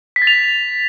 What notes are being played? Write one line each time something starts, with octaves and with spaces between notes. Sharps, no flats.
B6
A6
F7